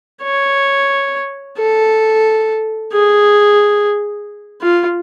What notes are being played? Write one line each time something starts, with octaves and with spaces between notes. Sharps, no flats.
C#5
A4
G#4
F4